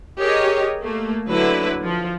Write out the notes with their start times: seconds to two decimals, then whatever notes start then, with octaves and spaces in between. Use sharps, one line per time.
0.18 G4 G#4 A#4 C#5 D#5
0.81 A3 A#3
1.27 D3 F#3 E4 B4
1.83 F3